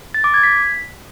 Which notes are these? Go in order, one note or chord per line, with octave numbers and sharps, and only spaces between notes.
A6
D6
G#6
B6